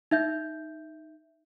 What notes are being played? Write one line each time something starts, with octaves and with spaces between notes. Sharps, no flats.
D#4 E5 G6